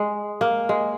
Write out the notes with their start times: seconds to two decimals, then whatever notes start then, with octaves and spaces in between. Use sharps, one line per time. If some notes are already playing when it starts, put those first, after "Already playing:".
Already playing: G#3
0.41 A#3
0.69 G#3